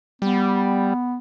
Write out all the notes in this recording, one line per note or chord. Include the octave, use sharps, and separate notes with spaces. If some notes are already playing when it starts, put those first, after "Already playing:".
G3 B3